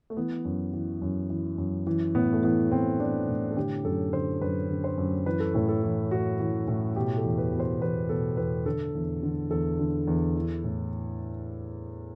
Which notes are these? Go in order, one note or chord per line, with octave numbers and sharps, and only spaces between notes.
A3
E3 B3
F#2
E3
F#2
E3
F#2
E3
A2 B3
A3
E3 B3
A2 C4
E3 D4
A2
A4
D3 G4
F#2 A4
D3 C5
F#2 B4
D3
C5
F#2
E3 B4
A4
A2 B4
A4
E3
A2 F#4
E3
A2
B2 G4
A4
E2
B4
B2
C5
E2 B4
B2 A4
E2 B4
D3 A4
E2
D3
E2 A4
D3
E2
E3
A2